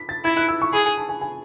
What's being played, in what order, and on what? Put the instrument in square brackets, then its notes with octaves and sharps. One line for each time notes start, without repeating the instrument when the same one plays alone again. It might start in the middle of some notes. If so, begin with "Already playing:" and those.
Already playing: [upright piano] B6
A6
[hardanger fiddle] E4 [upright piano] G#6
[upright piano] F#6
E6
C#6
[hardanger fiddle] G#4 [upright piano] B5
[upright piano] G#5
A5
G#5
G#5